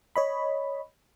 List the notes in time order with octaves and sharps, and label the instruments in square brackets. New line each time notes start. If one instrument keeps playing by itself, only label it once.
[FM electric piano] C#5 D#5 B5